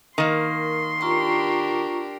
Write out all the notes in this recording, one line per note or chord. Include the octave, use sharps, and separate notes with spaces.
D#3 A#3 C6
D4 F4 G4 A#4 A#5 C#6